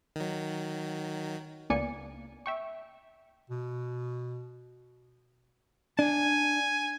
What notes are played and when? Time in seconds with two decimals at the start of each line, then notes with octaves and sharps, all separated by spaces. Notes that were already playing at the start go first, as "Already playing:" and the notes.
0.16 D#3 F#3
1.70 C#2 A#3 B3 D5 G#5 C#7
2.46 E5 G5 C#6
3.50 B2
5.99 D4 G#5